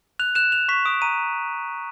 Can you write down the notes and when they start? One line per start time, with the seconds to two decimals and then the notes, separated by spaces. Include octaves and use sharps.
0.19 F#6 F7
0.35 F#6 E7
0.52 F#6 F7
0.69 C#6 B6
0.85 D#6 D7
1.02 A#5 D#7